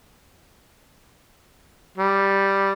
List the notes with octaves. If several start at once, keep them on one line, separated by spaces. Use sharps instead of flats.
G3